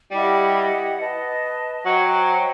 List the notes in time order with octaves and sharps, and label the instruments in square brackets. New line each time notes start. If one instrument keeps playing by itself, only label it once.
[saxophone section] G3 [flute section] E4 G4 D#5 F#5
[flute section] B4 D#5 A5
[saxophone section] F#3 [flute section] C5 D#5 G5